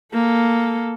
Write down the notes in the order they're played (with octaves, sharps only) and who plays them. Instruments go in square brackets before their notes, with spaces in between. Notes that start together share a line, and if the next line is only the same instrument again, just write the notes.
[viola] A#3 A4